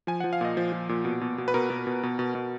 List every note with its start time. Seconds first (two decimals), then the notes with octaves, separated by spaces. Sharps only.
0.07 F3 G#5
0.20 F#5
0.24 F3
0.33 F5
0.41 A#2 D#5
0.57 F3
0.73 F3
0.89 A#2
1.05 B2
1.21 B2
1.38 B2
1.48 B4
1.54 B2 A#4
1.70 B2
1.87 B2
2.03 B2
2.19 B2
2.35 B2